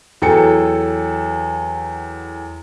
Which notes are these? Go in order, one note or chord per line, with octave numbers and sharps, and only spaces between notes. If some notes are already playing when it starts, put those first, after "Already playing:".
E2 F#3 A4 G5 C#7